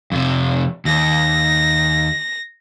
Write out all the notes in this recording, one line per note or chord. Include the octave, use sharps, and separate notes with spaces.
F2 C3
D#2 A#6